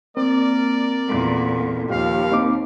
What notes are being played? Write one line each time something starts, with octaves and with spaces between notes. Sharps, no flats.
A#3 C4 A#4 D5
E2 A#2 A4
D#2 F3 G4 F5
A#3 C4 D#4 D6